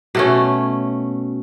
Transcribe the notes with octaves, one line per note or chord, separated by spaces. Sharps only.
B2 A3 C#4